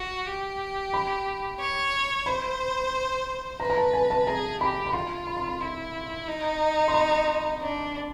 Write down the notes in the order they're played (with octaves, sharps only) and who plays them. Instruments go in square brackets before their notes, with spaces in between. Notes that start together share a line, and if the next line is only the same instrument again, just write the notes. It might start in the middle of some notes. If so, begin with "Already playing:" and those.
Already playing: [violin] F#4
G4
[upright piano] B5
[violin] C#5
[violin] C5 [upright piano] B5
[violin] B4 [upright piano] A#5
[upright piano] A#5
A5
G#5
A5
[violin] G#4 [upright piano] A#5
[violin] G4 [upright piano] B5
[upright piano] B5
[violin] F4 [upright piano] C6
[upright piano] B5
C6
B5
[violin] E4 [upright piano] C6
[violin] D#4
[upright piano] C6
B5
[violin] D4